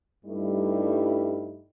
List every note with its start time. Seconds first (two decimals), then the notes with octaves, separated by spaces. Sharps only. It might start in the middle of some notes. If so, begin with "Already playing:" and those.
0.25 G2 G3 A3 D#4 E4